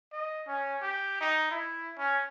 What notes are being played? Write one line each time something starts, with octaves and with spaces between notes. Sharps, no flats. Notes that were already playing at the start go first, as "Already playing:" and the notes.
D#5
C#4
G4
D#4
E4
C#4